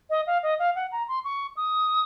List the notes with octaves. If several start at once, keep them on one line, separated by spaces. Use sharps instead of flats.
D#5
F5
D#5
F5
F#5
A#5
C6
C#6
D#6